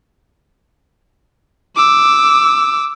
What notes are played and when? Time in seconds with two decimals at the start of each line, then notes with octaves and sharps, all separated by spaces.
1.76 D6 E6